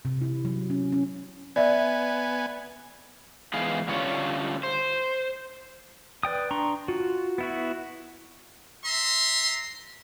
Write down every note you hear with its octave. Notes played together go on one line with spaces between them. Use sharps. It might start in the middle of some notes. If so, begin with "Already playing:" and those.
C3
E4
F#3
C#4
C#4
B3 D5 E5 G#5
G#2 E3 B3 G#4 F5
D3 G3 C#4 F4 C#5
C5
B4 D5 G5 D#6
D4 A#5 C6 C#6
F4 F#4
B3 E4 F#4
E5 A#5 C6